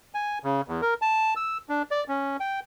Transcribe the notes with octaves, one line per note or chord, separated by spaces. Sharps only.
G#5
C#3
E2
A#4
A5
E6
D4
D5
C#4
G5